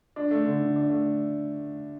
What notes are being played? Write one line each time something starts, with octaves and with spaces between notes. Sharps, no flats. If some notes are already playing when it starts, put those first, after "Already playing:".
D4
A3
D3
D3
D4
A3